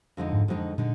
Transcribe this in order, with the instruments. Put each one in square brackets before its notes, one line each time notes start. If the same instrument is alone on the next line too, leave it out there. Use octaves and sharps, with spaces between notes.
[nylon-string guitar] F2 D3 G#3 D#4
[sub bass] G#2
[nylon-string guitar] F2 D3 G#3 D#4
[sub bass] A#2 [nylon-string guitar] D3 G#3 D#4